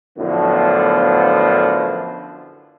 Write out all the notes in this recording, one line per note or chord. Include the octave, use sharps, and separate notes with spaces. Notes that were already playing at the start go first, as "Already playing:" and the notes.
F#2 A2 D3 F3 B3